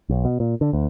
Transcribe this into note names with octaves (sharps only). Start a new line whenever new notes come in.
B1
B2
A#2
D3
D2